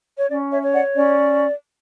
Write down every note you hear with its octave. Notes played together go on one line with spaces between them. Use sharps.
C#5
C#4 D5
C#5 E5
C#5
D5 F#5
C#4 D5